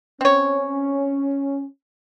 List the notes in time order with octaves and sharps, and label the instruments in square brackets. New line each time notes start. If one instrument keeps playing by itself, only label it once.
[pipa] C4 C#5 [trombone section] C#4